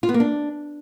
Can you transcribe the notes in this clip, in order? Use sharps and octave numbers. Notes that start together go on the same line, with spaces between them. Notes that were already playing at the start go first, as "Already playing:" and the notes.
F4
B3
A#3
D4